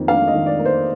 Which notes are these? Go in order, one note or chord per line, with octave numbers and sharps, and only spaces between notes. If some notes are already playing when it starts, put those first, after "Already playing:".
Already playing: F2 D#3 A#3
D4 F5
D#5
D#3
D5
A#3
C5